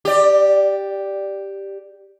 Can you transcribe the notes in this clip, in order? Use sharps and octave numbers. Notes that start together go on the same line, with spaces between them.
G4 D5